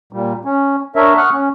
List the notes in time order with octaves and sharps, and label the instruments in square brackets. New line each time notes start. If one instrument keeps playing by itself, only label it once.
[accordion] A#2 G3
C#4
D4 A#4 C#5 E5
F#5 C#6 D#6 F6 F#6
C#4